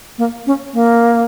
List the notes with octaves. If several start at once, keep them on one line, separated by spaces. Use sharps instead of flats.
A#3
C#4
A#3